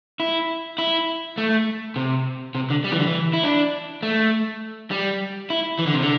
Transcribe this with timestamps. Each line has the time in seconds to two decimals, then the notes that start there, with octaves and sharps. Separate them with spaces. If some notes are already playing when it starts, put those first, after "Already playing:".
0.20 E4
0.78 E4
1.38 A3
1.96 C3
2.55 C3
2.70 D3
2.84 G3
2.92 E3
2.99 D3
3.07 E3
3.33 E4
3.43 D4
4.03 A3
4.91 G3
5.50 E4
5.79 E3
5.87 D3
5.94 C3
6.02 D3